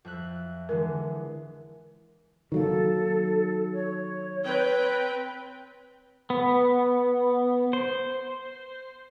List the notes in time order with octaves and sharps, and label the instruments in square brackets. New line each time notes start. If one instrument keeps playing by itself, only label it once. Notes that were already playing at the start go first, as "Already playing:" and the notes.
[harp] F2 E5 F#6
[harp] D3 E3 G#3 [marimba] A#4
[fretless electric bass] D#3 F#3 A#3 [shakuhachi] A4
[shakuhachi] C#5
[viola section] C4 B4 G5
[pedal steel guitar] B3
C5